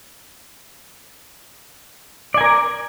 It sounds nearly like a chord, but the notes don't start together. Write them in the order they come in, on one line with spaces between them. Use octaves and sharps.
D5 G#5 A#4